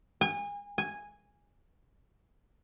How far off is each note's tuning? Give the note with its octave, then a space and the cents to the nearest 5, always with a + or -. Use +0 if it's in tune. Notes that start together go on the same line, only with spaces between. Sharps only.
G#5 -35
G#5 -10